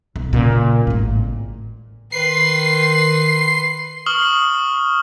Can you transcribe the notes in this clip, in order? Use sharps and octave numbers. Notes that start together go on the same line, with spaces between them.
B1
A#2 C#3
G#1 A2
D#3 B4 C6 C7
C#6 D#6 F6 F#7 G7